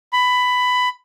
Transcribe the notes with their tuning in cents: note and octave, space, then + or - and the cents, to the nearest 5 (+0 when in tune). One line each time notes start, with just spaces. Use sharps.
B5 +15